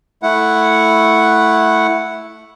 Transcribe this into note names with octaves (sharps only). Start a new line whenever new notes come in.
A3 E4 F#5